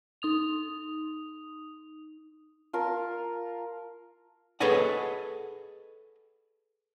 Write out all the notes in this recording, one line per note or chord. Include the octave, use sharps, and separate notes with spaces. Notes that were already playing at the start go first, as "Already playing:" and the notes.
D#4 D#6 F7
F4 A#4 A5
G#4 A4 B4 C#5 D#5 F#5